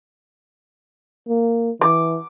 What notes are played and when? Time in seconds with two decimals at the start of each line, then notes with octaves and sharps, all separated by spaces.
1.28 A#3
1.81 E3 D6